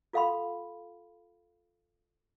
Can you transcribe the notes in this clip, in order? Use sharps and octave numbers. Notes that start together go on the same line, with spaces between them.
F4 A4 F5 F#5 B5 C6